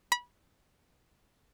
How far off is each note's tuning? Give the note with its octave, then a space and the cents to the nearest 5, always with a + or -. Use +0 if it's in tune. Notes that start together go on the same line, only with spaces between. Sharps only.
B5 -25